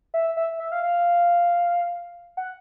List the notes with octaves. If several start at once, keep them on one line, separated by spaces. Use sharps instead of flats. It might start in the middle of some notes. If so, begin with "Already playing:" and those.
E5
E5
E5
F5
F5
F#5